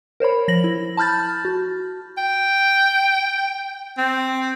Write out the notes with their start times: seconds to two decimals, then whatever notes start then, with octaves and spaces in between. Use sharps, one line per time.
0.20 A#4 C5 C#5 B5
0.48 F3 A#6 F#7
0.64 E4
0.97 A5 B5 F6 G6 A6
1.45 F#4
2.18 G5
3.98 C4